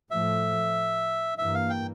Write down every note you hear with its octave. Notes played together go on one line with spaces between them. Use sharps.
A2 F3 A3 E5
G2 E3 A#3 E5
F5
G5